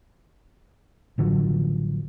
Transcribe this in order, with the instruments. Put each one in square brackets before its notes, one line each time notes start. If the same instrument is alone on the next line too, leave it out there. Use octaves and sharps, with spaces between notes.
[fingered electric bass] A1 D3 F3 F#3